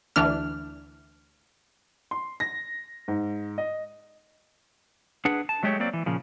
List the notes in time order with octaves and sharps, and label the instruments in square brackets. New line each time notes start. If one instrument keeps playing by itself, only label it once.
[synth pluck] D2 E3 D4 F6
[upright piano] C6
A#6
G#2
D#5
[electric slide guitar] D4 G#4 B4 F#5
A5
F#3 G#3 A3 G4 G#4 C#5
F#3 A#3 C4 D5
E3
A#2 C#3 F3